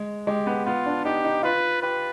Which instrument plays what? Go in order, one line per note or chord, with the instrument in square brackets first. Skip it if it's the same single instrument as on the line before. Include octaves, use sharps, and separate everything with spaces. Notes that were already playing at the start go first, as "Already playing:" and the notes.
Already playing: [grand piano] G#3
[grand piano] G#3 [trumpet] G4
[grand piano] B3
[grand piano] B3 [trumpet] F4
[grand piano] D4
[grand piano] D#4 [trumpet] G4
[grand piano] D#4
[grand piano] F4 [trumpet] B4
[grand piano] G4 [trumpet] B4